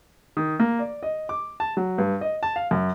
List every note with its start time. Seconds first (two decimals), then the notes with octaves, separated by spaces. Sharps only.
0.37 D#3
0.60 A#3
0.79 D5
1.03 D#5
1.29 D6
1.60 A5
1.77 F#3
1.98 G2
2.21 D#5
2.43 A5
2.56 F5
2.71 F#2